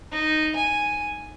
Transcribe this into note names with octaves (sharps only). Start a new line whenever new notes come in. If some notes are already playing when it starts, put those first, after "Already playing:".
D#4
G#5